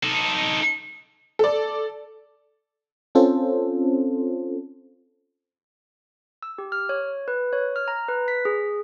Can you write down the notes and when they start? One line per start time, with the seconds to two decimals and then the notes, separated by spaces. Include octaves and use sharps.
0.03 D#4 A4
1.39 A4 D5
3.15 C4 C#4 F4 A4 C5
6.43 E6
6.58 G4
6.72 F6
6.89 C#5
7.28 B4
7.53 C#5
7.76 F6
7.88 A#5
8.08 B4
8.28 B6
8.45 G#4